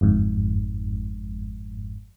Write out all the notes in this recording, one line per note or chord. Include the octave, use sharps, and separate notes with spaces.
G1 F2 G#2